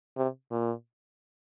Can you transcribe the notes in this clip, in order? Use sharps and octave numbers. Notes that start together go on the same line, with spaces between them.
C3
A#2